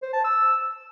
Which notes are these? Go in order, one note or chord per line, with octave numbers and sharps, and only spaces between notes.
C5
A5
E6